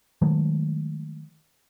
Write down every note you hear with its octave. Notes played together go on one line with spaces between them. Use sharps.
D#3 F#3 G#3 A3